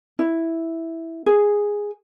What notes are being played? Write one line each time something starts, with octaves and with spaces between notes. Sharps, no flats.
E4
G#4